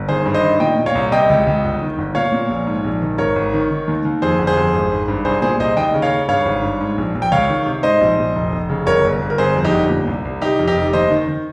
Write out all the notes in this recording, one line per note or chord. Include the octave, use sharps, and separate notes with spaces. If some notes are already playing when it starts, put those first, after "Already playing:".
Already playing: G1
D#3 G#4 C5
G2
C5 D#5
D#3
A#2 D#5 G5
A#2
C#5 F5
C2
C3 D#5 G5
C#2
C#2
G1
D#3
G1
A#2 C#5 F5
A#2
A#1
G#2
A#1
D#3
G#1 A#4 C#5
G#1
D#3
D#3
D#2
D#2
F2 G#4 C5
G1
G#4 C5
F2
G#1
G#1
G2
C2 G#4 C5
A#2 G#4 C5
C2 C5 D#5
D#2 D#5 G5
C#3
C#5 F5
C#3
G2 C#5 F5
G#1
G2
G#2
A#1
A#1
G5
C#2 C#5 F5
D#3
C3
G#2 C5 D#5
A#1
A#1
F1
F1
C#3
G1 A#4 C#5
G1
G1
A#4
G1 G#4 C5
F2
D#4 G4
G1
A#2
C2
C2
C3 D#4 G4
F2
D#4 G4
F1
D#2 C5 D#5
D#3
D#3